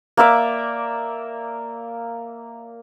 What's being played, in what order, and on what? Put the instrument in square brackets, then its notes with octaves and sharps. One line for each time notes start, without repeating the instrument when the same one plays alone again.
[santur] A#3 D5 E5 D6